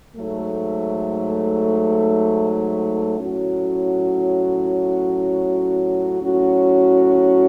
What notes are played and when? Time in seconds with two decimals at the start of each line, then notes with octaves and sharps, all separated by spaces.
0.17 G#2 F#3 A3
3.19 A2 F#3 C#4 F#4
6.20 A2 F#3 C#4 F#4